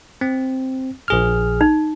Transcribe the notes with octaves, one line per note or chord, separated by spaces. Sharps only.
C4
A#1 G#4 F6
D#4